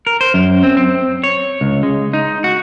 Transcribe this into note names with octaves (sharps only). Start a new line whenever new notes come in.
A#4
C5
F#2
C4
C4
C#5
C#2
G#3
D#4
F#4